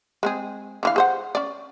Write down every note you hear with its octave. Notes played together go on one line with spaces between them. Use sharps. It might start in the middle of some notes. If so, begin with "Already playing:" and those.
G#3 C4 G#4
D3 E3 F5
G#4 C5 F#5
C#4 D5